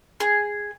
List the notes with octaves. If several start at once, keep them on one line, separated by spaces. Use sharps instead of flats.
G#4